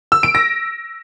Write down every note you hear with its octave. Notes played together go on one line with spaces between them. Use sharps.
E6
D7
A#6